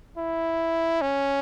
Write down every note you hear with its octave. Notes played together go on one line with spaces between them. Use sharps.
E4
C#4